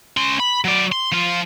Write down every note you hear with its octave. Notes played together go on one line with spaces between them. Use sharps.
C#4 C6
B5
F#3 D5
C6
F3 F4